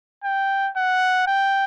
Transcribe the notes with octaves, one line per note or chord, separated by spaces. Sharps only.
G5
F#5
G5